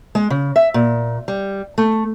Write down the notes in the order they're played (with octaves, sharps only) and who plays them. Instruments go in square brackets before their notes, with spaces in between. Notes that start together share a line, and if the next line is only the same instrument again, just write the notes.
[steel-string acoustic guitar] G#3
C#3
E5
A#2
G3
A3